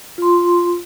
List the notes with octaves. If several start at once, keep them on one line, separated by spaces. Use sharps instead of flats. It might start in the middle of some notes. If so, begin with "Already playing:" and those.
F4 C6